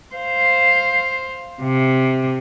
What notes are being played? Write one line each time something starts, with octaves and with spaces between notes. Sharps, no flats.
C5 F5
C3